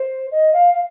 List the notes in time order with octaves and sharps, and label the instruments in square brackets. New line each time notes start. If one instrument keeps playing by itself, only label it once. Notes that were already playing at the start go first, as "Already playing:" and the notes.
Already playing: [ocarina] C5
D#5
F5
F5